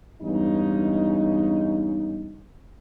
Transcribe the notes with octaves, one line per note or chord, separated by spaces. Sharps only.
E2 G2 C#3 G#3 D#4